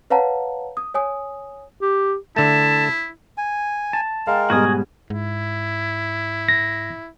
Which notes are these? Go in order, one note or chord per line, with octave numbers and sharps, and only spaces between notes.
B4 C#5 F5 F#5 A5 A#5
D#6
C#5 G#5 D#6
G4
D3 A3 E4 A5
G#5
A5
G#3 A#4 F5 G5
G#2 B2 G3 F#4 G#5 D#6
G#2 E4
A#6